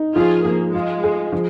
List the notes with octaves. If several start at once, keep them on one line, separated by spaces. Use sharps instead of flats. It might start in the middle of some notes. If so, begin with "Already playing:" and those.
Already playing: D#4
F3 F4 G#4
F3 A#3
G#3 F4
G#4
F3